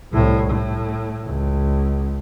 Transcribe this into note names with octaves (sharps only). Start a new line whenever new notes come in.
C2 A2
A2
C#2